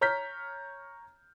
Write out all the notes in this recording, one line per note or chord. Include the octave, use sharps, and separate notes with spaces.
C#5 A#5 F6 G6 B6